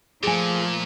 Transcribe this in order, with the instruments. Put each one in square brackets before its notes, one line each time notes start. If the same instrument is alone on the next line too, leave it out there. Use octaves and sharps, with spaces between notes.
[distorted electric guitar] A#2 [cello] F3 A3 [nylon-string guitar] G#4 G#5